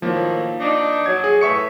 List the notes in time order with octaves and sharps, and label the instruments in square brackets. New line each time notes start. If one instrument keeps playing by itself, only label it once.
[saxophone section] A2 D#3 F#3 [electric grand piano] F3 A#3
[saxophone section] D4 D#4
[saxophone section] F#3 [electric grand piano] G#6
[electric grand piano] G#4
[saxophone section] A2 E3 A3 [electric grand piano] E5 C#6 C#7